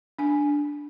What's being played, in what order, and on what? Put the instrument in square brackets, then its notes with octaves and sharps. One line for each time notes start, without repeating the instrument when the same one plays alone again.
[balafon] D4 G#5